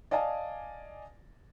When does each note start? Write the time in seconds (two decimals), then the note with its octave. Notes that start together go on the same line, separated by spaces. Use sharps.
0.11 D5 D#5 F5 G#5 A5